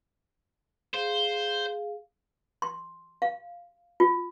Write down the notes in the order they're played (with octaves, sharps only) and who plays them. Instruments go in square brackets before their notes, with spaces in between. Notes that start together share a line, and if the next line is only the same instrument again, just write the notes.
[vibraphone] G#4 F5 [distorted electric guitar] C5
[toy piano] C6
F5
F4